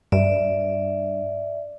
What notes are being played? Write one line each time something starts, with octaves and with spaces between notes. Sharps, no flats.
G2 D5 E5